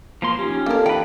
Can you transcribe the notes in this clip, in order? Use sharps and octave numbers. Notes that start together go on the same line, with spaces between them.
F3 A#3 C6
C#4 D#4 F4 G4
A#3 C4 D4 A4 A#4 F5 A5
E3 B4 G5